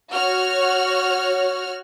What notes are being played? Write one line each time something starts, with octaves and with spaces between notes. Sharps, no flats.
F#4 C#5 F6